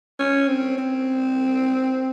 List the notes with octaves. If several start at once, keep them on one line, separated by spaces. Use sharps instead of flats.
C#4
C4
C4